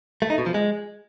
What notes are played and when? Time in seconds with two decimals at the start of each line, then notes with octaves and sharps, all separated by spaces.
0.22 A3
0.30 D#4
0.38 B2
0.46 F3
0.54 G#3